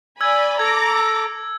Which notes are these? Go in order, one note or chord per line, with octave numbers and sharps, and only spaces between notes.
D5 G#5 B5 E6 G#6
A4 A#5 D6 G#6 A#6